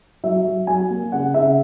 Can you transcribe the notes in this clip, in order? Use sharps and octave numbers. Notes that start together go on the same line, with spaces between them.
F#3 E5
F#3
F#3 G#5
A#3
C#3 F#5
C#3 E5